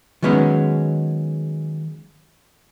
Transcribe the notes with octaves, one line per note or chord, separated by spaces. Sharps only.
D#3 F#3 G#3 B3 C#4